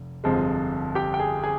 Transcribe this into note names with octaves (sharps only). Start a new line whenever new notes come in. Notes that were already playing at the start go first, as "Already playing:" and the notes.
Already playing: F1
G1 F2 C3 F3 G#3
G4 G5
G5
G#4 G#5
G#4 G#5